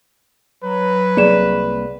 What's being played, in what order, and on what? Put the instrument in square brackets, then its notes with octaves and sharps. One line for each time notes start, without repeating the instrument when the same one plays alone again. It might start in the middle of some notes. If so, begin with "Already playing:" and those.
[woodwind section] F#3 [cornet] B4
[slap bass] C2 A#3 [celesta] G#4 D5 E7